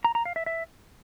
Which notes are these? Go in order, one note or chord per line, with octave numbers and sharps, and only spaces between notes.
A#5
A#5
F5
E5
E5